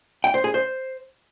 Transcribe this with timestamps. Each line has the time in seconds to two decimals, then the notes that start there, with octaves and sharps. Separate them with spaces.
0.24 G5
0.34 C5
0.44 G#4
0.54 C5